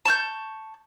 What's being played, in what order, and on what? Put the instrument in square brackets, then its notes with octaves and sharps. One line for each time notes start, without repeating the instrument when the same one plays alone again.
[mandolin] A5 C#6 F6 G6